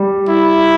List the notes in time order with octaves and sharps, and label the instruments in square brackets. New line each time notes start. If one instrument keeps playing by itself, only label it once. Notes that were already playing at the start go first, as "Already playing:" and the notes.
Already playing: [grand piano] G3
[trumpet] E4